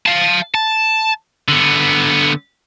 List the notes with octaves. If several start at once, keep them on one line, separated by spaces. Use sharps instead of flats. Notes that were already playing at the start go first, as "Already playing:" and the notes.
F5 A5
A5
D3 B3